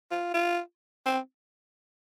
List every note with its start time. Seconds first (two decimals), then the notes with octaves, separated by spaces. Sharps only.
0.11 F4
0.34 F4
1.06 C4